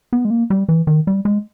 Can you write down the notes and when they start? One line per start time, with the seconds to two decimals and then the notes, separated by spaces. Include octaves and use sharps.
0.13 B3
0.25 G#3
0.30 A#3
0.50 G3
0.69 E3
0.87 D#3
1.07 G3
1.25 G#3